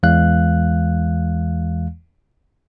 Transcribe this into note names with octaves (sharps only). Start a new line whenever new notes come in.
E2 E3 G#3 F5 F#6